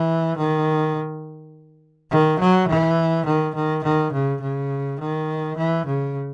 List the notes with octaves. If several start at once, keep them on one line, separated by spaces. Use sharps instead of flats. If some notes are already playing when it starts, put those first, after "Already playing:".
Already playing: E3
D#3
D#3
F#3
E3
D#3
D#3
D#3
C#3
C#3
D#3
E3
C#3